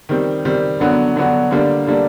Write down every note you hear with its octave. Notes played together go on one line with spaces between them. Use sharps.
D#3 G3 C4
D#3 G3 C4
D3 F#3 B3 D4 F#4
D3 F#3 B3 D4 F#4
D3 G3 A#3 D4
D3 G3 A#3 D4